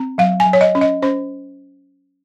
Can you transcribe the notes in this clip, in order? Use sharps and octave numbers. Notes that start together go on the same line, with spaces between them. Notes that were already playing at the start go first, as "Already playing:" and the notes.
Already playing: C4
F#3 F5
G#5
F#3
C#5
D#5
C#4
D#5
C#4 C5